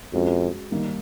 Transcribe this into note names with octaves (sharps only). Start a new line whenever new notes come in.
F2 G#3 C#4 F#4
D#3 G3 A#3 D#4